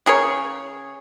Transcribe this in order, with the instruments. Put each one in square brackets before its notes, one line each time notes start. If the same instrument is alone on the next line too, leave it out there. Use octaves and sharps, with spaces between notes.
[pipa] C#3 G#4 A#4 C#5